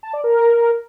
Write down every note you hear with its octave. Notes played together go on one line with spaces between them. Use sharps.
A5
D5
A#4